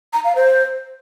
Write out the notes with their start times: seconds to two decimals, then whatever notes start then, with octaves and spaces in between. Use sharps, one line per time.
0.13 A#5
0.24 F5
0.35 C5